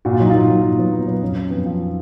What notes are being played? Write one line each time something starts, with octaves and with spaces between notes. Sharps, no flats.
A#2 F#4
F4
F#3 D#4
A#2 F4
F#3
A#2 F4
F#3 B3
A#2 B3
F#3 B3
F2 C#4
F3
F2 B3
F3